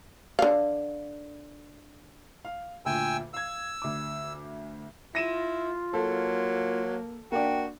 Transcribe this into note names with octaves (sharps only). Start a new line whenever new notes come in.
D3 F5
F5
D2 A#2 G5 G#5 E6
F5 E6 G#6
D2 D6
E4 F4 A#6 D#7 E7
F#3 A#3 A4
A#3 D4 F#4 G5